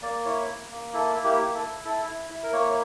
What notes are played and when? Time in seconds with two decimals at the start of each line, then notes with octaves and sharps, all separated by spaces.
0.02 A#3 D5
0.25 E4 C#5
0.48 A#3
0.70 A#3
0.93 E4 A4
1.16 A#3
1.24 G4
1.39 E4
1.54 A4
1.62 E4
1.85 E4 A4
2.08 E4
2.30 E4
2.43 A#4
2.53 A#3 C#5